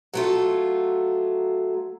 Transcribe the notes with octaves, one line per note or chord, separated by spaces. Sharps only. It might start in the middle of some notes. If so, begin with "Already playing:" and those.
F#3 A3 F4